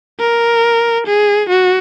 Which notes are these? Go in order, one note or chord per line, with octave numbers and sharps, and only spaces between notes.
A#4
G#4
F#4